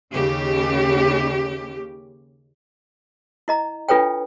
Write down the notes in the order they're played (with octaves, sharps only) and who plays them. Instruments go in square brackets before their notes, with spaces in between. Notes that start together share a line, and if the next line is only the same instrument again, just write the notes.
[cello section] D#2 C#3 G4
[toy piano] E4 D#5 A#5
D4 F4 A4 B4 C#5 G5